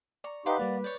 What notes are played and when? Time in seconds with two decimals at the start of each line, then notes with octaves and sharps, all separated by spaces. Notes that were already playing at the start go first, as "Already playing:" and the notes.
0.24 D5 A#5 C#6
0.46 D#4 G4 B4 F5 F#5 C6 D6
0.59 G3 A#3 D5
0.84 C#5 D5 G6